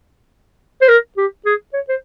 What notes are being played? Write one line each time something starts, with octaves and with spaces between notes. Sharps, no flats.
C5
A#4
G4
G#4
C#5
C5